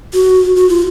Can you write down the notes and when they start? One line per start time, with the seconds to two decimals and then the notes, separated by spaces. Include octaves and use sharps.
0.14 F#4
0.56 F#4
0.69 F4